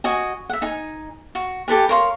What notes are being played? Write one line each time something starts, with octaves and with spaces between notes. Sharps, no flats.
F#4 D#5 G#5
E5 F#5
D#4 G#5
F#4
G4 A4 B4 G#5
A#4 C#5 F5 C6